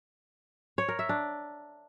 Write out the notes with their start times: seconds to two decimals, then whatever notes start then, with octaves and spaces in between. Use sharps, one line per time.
0.78 C#5
0.88 A#4
0.99 E5
1.09 D4